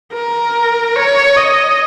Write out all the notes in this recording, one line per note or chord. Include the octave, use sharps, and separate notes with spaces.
A#4
C#5
D#5